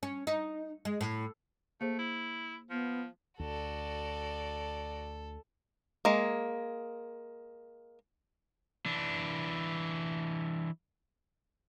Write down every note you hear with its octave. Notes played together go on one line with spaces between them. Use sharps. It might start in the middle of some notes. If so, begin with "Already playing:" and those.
C#4
D#4
G#3
A2
A3 A#3 G#4 C5
E4
F3 B3
D2 F#4 A4 D5
G#3 A#3
E3 D4